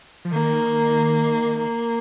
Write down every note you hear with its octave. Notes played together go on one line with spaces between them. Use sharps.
F3
D#3 A#3
A#3